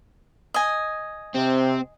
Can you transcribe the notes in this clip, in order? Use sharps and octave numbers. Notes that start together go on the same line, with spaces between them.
D#5 G#5
C3 C4